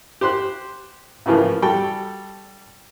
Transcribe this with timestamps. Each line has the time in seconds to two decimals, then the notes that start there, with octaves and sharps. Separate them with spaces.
0.21 G4 C5 C6 F#6
1.26 A2 C#3 E3 F3 A#3
1.62 G3 F#4 A4 G5